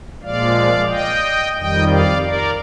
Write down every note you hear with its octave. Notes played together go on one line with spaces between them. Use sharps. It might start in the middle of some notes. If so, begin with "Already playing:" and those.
A#2 F3 G#3 D5 F5
D#5 G5
F2 D#3 G3 D#5 G5
D5 F5
A#4 D5